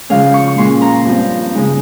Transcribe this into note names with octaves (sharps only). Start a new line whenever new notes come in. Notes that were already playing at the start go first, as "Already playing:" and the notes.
C#3 F3 G#3 C#4 F5
C#6
C#6
A#2 G#3 C#4 C6
A#5
G2 F3 C4
C#3 G#3 D#4